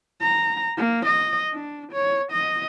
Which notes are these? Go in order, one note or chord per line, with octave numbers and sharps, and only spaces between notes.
A#5
A#3
D#5
D4
C#5
D#5